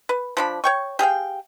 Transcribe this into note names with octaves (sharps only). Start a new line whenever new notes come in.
B4
F3 D4 B5
C#5 G5 C#6
G4 G#4 F5 G5